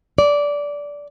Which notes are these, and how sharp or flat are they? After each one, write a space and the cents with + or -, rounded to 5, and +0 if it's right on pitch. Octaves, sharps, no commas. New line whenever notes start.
D5 -15